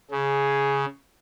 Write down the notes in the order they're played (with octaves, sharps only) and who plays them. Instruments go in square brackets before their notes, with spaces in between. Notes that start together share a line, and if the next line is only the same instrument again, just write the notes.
[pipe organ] C#3 [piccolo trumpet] G#4